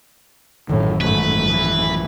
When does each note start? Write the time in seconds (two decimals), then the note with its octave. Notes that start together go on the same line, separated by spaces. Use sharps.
0.70 A1 F#2 A2 D#3
1.01 G#2 A3 B4
1.49 E3